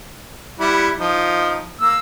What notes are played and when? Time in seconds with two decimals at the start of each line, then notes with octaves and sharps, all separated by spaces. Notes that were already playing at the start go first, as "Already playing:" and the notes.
0.60 G3 E4 F#5
0.99 F3 D#4
1.81 A#3 E6